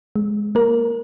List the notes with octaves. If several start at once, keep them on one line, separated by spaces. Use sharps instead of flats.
G#3
A#3 A#4